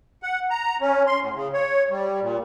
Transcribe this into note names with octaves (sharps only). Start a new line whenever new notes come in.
F#5
A#5
C#4
C6
A2
C#3
C#5
G3
A#2